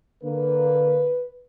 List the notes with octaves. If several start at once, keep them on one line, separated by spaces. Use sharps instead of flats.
D3 A#3 B4